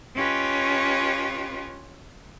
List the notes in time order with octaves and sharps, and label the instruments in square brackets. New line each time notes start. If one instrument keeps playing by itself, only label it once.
[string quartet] C#4 F4 G4 B4 C#5 D#5